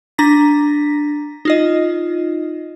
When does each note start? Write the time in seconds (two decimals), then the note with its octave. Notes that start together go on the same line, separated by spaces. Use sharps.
0.18 D4 A#5 A#6 B6
1.45 D#4 F4 D#5